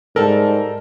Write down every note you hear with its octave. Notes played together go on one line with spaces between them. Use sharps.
G#2 G3 A4 A#4